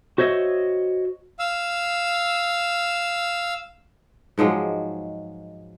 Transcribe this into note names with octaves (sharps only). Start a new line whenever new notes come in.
F#4 C5 C#5 D#5 E5
F5 E6
G#2 F3 F#3 G#3